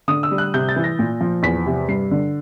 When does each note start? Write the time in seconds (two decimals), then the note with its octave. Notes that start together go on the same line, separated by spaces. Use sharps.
0.08 D3 D#6
0.23 E6
0.31 G3
0.38 F#6
0.54 C3 G6
0.69 A6
0.76 E3
0.84 A#6
0.99 A#2
1.21 F3
1.43 E2 B6
1.66 C3
1.89 G2 C7
2.11 D3